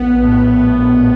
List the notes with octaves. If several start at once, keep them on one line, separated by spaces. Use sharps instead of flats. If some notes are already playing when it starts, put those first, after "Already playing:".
Already playing: A#1 B3
A2
A2
A#1